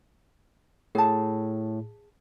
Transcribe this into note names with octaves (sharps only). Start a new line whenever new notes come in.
A2 G#4 A5